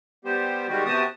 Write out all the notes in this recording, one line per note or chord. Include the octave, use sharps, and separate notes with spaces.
G3 B3 G4 C5
D#3 G3 G#3 F#4 G4
C3 B3 F#4 G4 A5 D#6